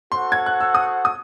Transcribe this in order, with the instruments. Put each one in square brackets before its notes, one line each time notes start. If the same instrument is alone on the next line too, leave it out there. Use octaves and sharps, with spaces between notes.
[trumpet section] F#4 A4 C5 F#5 [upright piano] C6
[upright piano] G#6
F#6
E6
D#6
D#6